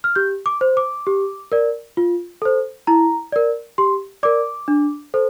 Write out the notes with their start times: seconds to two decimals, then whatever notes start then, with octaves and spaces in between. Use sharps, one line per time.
0.04 F6
0.16 G4 G6
0.46 D6
0.61 C5
0.77 D6
1.07 G4
1.52 A#4 D5
1.97 F4
2.42 A4 C5
2.87 E4 A#5
3.32 A#4 D5
3.78 G4 C6
4.23 A#4 D5 D6
4.68 D4
5.14 A4 C5